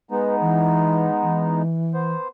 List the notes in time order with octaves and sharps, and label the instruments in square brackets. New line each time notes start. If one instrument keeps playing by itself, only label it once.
[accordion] G#3 B3 D#4 [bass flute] B4
[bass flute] E3
E3
[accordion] B3 C5